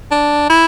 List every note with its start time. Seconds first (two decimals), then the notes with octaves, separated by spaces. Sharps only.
0.11 D4
0.50 E4